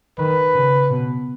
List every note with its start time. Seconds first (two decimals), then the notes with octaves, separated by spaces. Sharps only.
0.18 D#3 B4
0.53 C#3
0.89 B2